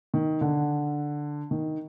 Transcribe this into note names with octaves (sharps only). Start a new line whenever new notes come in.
D#3
D3
D#3